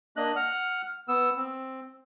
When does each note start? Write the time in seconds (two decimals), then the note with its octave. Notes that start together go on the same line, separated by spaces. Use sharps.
0.17 A#3 D4 D#5 F#6
0.36 F#5 F6
1.08 B3 E6
1.36 C4